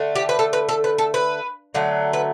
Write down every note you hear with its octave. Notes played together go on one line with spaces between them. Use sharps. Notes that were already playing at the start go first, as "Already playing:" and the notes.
Already playing: D3 A3
G4
B4
A4
B4
A4
B4
A4
B4
D3 F#3 A3
B4